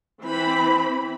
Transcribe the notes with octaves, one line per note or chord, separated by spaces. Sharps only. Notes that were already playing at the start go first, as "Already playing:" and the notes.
E3 C4 B5